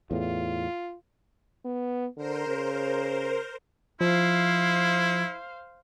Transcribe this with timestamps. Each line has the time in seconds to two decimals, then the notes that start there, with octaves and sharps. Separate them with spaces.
0.11 E2 A2 F4
1.65 B3
2.17 D3 A#4 C5
2.47 C#3
4.01 F3 E4 C5 F5